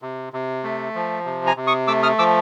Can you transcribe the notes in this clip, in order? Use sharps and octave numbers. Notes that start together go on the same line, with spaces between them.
C3
C3
A3
F3
C3
G#5 A#5
C3
C#6 D#6
A3 D6 E6
D#6 F6
F3 D6 E6